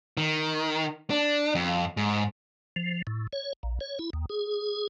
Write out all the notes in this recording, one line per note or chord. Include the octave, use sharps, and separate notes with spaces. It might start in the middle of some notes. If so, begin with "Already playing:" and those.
D#3
D4
F2
G#2
F3
A2
C#5
A#1
C#5
E4
D#2
G#4